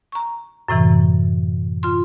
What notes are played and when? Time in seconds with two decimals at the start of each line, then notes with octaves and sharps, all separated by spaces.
0.12 A#5 C#6
0.68 F#2 A2 C3 E3
1.83 F4 C6